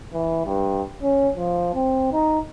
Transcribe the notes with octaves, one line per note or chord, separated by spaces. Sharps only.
E3
G2
C#4
F3
C4
D#4